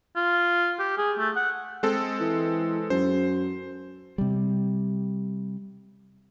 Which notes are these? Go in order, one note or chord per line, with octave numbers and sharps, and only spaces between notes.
F4
G4
G#4
A3
F#5
G#3 C4 A4
E3
F#2 C5
C3 G3